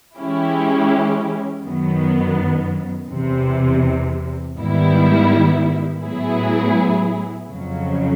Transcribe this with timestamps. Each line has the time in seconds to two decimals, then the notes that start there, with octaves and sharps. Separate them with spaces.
0.16 E3 G#3 C#4 E4 G4
1.63 F#2 D#3 F#3 B3
3.09 E2 C3 E3
4.55 G#2 D#3 G3 B3 E4
6.02 A2 F#3 B3 E4 G#4
7.49 F2 C#3 F#3